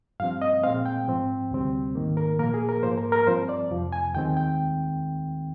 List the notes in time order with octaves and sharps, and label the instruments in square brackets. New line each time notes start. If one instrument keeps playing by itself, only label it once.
[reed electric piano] G2 F3 C4 F5
D#5
A#2 G#3 C4 F5
G5
G#2 F3 C4
D2 C3 G3 C4
G#2 D#3 A#3
A#4
A#2 F3 A#3 A#4
G#4
A#4
G#2 F3 A#3 C5
A#4
A#4
G2 F3 C4 C5
D5
F2 C3 F3
G#5
D#2 D#3 G#3 C4 G5
G5